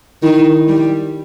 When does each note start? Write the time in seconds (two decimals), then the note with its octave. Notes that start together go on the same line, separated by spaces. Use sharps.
0.22 D#3 E4
0.68 G3